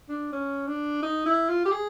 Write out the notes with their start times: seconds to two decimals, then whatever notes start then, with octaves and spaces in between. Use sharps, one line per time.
0.09 D4
0.33 C#4
0.68 D4
1.03 D#4
1.26 E4
1.49 F4
1.65 G4
1.72 G#4